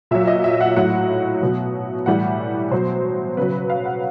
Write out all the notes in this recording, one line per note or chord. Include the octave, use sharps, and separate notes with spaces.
A#2 F#3 E5
D#5
E5
F#5
A2 F#3 F#5
B2 F#3
A2 E3 G3 F#5
B2 F#3 C5
C#3 F#3 B4
F5
F#5